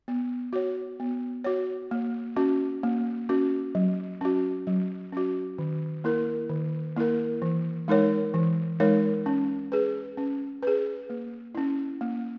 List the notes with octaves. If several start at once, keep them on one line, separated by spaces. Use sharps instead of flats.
B3
F#4 C#5
B3
F#4 C#5
A#3
C#4 F#4
A#3
C#4 F#4
F#3
C#4 F#4
F#3
C#4 F#4
D#3
A#3 E4 A#4
D#3
A#3 E4 A#4
E3
G#3 D#4 A#4 C#5
E3
G#3 D#4 A#4 C#5
C#4
G#4 B4
C#4
G#4 B4
A#3
C#4 E4
A#3